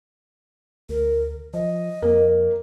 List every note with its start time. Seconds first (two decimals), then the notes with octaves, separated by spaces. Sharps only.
0.89 D2 A#4
1.54 F3 D#5
2.02 F2 A#3